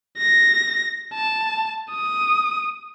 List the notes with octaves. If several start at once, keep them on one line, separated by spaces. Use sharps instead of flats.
A#6
A5
D#6